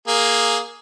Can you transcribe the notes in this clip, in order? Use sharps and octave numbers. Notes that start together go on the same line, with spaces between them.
A#3 G#4